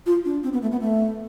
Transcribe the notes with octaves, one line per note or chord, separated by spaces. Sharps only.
F4
D4
C4
B3
A3
B3
A3